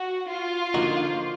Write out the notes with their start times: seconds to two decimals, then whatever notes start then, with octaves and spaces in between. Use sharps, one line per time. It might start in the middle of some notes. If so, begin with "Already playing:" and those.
Already playing: F#4
0.29 F4
0.74 D3 F3 A#3 D#4 F#4